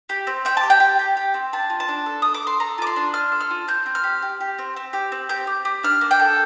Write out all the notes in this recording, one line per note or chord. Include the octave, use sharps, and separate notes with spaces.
G4
C4
C4 G5
A5
G4
G5
G4
G4
G4
C4
D4 A5
F4
A5
D4
A4
A4 D#6
D6
A4 C6
A4 A#5
F4 D6
C6
D4
F4 F6
A4
F6
F4
C4 G6
C4
F6
G4
G4
G4
C4
C4
G4
C4
G4 G6
G4
G4
D4 F6
A#3
G5
A4